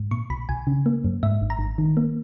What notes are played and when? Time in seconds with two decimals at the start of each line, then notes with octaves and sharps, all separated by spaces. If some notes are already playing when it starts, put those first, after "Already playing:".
Already playing: G#2
0.11 A#2 C#6
0.30 B1 B5
0.49 B1 G#5
0.67 C#3
0.86 A#3
1.04 F#2
1.23 G#2 E5
1.41 G#1
1.50 A#5
1.59 G#1
1.78 D#3
1.97 A#3